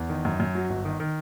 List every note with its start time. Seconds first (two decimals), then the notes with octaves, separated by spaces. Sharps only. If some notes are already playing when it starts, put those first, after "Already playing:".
Already playing: E2
0.09 D#3
0.25 F#2
0.40 F#2
0.55 F#3
0.70 G1
0.85 D#3
1.00 D#3